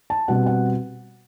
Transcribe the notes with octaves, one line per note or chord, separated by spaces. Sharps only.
A5
B2 G3 C4 F#5
F#5